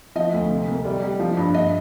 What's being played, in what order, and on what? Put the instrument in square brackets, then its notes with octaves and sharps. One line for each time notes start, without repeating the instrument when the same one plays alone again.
[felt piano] F3 D#5
D2
C3
C2
G3
G3
F3
G2
G2 D#5